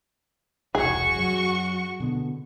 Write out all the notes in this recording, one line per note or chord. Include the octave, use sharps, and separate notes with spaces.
E1 C2 F#4 G#4 C#6
F#2 F#3
B2 D3 B3